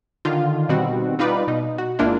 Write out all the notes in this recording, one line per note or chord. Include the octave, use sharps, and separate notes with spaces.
D3 D#3 F4
B2 D#3 G3 C4 F#4
G3 D#4 F4 B4 D5
B2 D#4
F#4
G1 G#3 A#3 D4 E4 F4